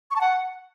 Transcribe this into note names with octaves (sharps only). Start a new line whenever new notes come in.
C#6
A5
F#5